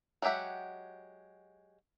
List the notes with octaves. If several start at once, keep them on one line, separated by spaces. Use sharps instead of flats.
F#3 G#3 G4 E5 F#5